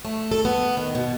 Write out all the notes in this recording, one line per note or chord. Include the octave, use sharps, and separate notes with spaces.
A3
A4
B3
D#3
B2